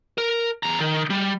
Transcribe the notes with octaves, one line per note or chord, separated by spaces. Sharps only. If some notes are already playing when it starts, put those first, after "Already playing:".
A#4
E2 A#5
D#3
G3